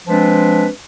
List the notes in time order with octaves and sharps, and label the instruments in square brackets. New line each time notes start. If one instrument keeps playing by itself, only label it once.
[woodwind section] F3 G#3 C4 D4 B4